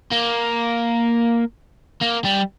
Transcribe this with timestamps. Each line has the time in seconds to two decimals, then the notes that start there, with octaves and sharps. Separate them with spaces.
0.12 A#3
2.01 A#3
2.24 G3